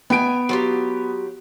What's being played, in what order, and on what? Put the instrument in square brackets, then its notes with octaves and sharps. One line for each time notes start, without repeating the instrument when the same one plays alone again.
[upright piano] B3 D7 [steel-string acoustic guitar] G5 G#5
[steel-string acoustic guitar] F#3 F4 G4